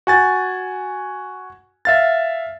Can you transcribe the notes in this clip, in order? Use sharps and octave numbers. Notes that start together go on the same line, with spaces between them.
F#4 G#5 A6
E5 F5 A6